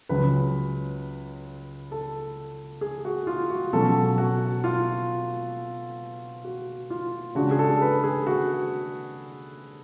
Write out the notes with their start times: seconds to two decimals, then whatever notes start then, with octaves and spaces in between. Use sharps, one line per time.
0.09 C#2 C#3 F#3 B4
1.91 A4
2.81 G#4
3.05 F#4
3.27 F4
3.50 F#4
3.73 B2 F#3 C#4 A4
4.18 F#4
4.64 F4
6.45 F#4
6.90 F4
7.35 C#3 G#3 D4 F#4
7.51 G#4
7.59 A4
7.82 B4
8.04 G#4
8.27 F#4